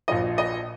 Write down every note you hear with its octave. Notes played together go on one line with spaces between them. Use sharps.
A#1 A#2 F3 D#5
D#5